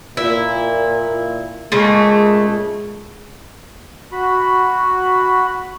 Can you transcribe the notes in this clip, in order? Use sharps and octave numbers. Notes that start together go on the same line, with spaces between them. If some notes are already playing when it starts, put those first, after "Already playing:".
A#2 E4
A#2 C#3 G#3 A3
F#4 B5